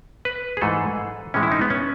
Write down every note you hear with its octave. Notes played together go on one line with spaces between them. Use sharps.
B4
G#4
G#2 E3 A3 A4
A2 E3 G#3 C#4
E4
D#4
B3
C#4